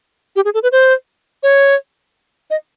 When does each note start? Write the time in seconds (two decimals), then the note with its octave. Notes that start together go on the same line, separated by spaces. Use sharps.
0.36 G4
0.45 G#4
0.54 A4
0.63 B4
0.72 C5
1.43 C#5
2.50 D#5